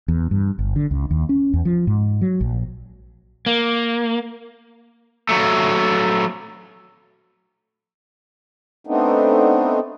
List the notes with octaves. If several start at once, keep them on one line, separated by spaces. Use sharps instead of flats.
E2
G2
G1
D3
C#2
D#2
C#4
E2
F3
G#2
F#3
A#1
A#3
F#3 A3
A3 B3 C4 D4 D#4